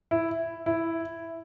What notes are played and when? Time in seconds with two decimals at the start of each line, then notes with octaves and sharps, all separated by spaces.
0.11 E4
0.66 E4